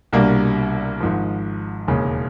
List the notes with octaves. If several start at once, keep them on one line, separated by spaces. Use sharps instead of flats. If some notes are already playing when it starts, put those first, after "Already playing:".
C2 B2 G3 A#3 D4
G#1 G#2 F3
E1 D#2 C#3